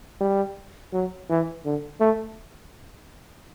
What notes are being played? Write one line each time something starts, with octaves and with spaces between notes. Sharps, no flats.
G3
F#3
E3
D3
A3